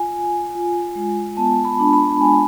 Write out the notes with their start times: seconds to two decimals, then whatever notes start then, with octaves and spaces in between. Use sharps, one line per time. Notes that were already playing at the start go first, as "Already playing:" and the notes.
Already playing: F4 G#5
0.13 F4
0.55 F4
0.95 G#3
1.37 B3 A5
1.65 B5
1.79 D4
1.93 B5
2.20 G#3 G#5